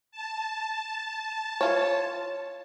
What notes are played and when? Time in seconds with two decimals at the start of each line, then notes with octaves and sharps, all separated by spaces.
0.12 A5
1.61 F4 C#5